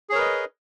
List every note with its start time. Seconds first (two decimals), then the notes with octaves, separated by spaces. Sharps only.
0.09 G#4
0.12 C#5
0.15 A#4
0.18 B4
0.21 D#5